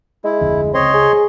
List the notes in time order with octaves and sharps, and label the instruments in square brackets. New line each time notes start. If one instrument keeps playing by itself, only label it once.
[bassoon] G#3 [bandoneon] E4
[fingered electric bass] F1 D2
[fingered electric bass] C#2 [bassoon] C4 [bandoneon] C#5 D#5 C6
[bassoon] G#4